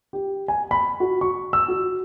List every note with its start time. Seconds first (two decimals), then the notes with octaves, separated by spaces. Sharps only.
0.13 G4
0.48 G#5
0.71 B5
1.00 F#4
1.21 C#6
1.53 E6
1.68 F#4